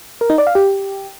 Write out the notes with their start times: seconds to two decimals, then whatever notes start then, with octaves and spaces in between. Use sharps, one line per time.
0.21 A#4
0.30 D#4
0.38 D5
0.47 F5
0.55 G4